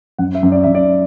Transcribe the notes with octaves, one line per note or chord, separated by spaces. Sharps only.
F#2 F#5
E5
F#2
D5
F#2 E5
D5